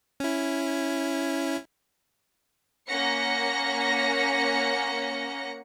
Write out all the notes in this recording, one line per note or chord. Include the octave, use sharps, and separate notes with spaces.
C#4 E4
A#3 C#4 F#5 A#6 C#7